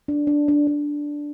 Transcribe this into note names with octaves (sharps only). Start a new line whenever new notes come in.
D4
D4
D4
D4